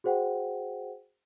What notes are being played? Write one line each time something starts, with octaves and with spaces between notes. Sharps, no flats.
F#4 G#4 C5 F#5 G5